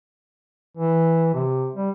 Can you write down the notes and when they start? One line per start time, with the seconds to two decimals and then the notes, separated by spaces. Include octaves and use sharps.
0.77 E3
1.34 C3
1.75 G3